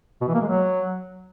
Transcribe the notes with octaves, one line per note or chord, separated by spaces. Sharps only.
B2
E3
A#3
G#3
F#3